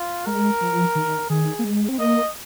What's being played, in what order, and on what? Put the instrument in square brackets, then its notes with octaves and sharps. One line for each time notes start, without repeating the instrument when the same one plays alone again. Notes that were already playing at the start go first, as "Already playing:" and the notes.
Already playing: [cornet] F4
[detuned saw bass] G#3 [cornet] A#4
[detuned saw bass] F3
D#3
[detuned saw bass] D#3 [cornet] G#4
[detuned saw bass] A#3
G#3
C4
[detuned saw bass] A#3 [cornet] D#5